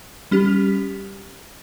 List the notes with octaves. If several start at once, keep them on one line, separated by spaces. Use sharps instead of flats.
G3 C#4 G4